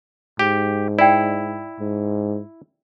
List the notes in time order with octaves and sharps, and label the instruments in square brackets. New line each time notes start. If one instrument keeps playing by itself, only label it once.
[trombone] G#2 [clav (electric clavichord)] G4
[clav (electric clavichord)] E4 [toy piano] D5 G5
[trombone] G#2